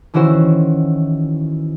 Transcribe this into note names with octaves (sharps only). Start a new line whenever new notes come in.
D#3 E3 C#4 E4 F#4 C5